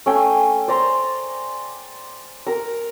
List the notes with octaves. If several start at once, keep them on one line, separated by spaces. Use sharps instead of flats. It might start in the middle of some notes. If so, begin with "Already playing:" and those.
A3 C#4 G5 G#5
C5 D5 A#5 C6
A#4 A#5